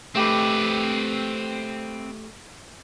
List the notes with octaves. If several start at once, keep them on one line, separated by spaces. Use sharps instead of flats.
A3 C4 G4 B4